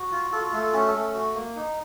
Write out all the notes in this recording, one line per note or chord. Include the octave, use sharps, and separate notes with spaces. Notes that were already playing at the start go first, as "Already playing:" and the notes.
Already playing: F#4
F4
F4 A4
F#4
A3 A4
A4
C#4 F#4
A4
A3
F#4
A#3
D#4